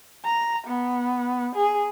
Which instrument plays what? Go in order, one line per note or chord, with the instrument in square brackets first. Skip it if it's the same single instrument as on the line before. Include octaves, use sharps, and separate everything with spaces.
[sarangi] A#5
B3
G#4